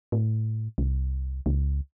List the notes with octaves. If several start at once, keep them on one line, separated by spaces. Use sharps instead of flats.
A2
C2
C#2